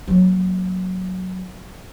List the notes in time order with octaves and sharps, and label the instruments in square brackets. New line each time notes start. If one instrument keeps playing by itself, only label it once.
[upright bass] F#3 A#3